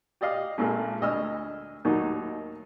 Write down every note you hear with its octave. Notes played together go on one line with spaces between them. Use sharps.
G4 D5 D#5 F5
G#1 A#2 A4
D2 D#5 G#5 E6 F6
D#2 A2 D#3 F#3 D#4